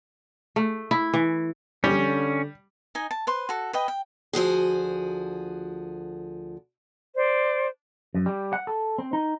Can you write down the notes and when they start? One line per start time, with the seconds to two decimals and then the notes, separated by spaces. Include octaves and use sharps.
0.56 A3
0.91 E4
1.14 E3
1.84 D3 G3 C#4
2.95 D#4 D#5 G#5
3.11 A5
3.27 B4 C5 C6
3.49 F#4 A4
3.73 B4 D#5 G5
3.88 G5
4.33 D2 F3 F#4 G#4
7.15 C5 D5
8.15 F#2
8.26 G3
8.53 F#5
8.67 A4
8.98 C4
9.13 D#4